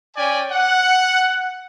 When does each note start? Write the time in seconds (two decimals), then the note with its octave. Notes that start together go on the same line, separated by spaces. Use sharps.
0.16 C#4 D5 G5 G#5
0.51 F#5